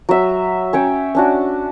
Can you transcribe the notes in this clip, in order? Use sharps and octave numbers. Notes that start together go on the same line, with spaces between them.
F#3 E5
C#4 C#5 G5
C#4 D4 F#4